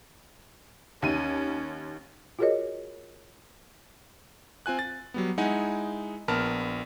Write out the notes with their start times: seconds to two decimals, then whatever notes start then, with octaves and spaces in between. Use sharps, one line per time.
1.02 D#2 C#4 D#7
2.39 F4 F#4 G#4 A#4 C#5 D#5
4.66 C4 F4 G#5 F#6
4.79 A6
5.14 F#3 G3 B3
5.38 G#3 D#4 E4 F#5 G#5
6.28 A#1 B3 A#4 A5 F6